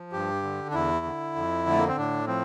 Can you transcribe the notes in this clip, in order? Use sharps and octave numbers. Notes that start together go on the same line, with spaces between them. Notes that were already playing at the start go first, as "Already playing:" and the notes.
Already playing: F3
G2 G4
D3
D4
E2 E4
D3
F2
D3 A3
A#3
C4
A2 D4
F3 C4